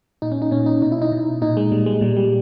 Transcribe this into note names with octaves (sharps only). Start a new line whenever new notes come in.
A#2 D#4
C#4
D#4
A#2 C#4
D#4
B2 D#4
E4
D#4
B2
A#2 D#4
G#3
A#2 G3
G#3
A#2 G3
G3